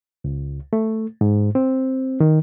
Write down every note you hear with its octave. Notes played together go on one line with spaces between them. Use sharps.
C#2
A3
G#2
C4
D#3